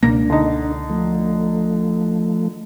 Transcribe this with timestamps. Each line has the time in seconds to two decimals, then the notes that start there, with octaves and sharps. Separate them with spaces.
0.03 C#2 B2 A#3 D4 A#6
0.30 D3 D#4
0.90 F3 A3